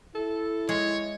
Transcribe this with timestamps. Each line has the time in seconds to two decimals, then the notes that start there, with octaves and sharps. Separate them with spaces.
0.15 E4 A4
0.69 G#3 C#5